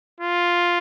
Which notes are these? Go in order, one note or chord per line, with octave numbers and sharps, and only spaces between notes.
F4